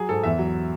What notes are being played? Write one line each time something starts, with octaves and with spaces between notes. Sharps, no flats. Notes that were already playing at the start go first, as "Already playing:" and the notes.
Already playing: F#3 G#4
G#2 A4
E2 E5
F#3